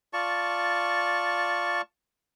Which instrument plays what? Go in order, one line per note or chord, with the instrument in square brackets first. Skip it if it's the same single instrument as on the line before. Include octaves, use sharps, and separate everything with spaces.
[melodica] F4 D5 A5 C#6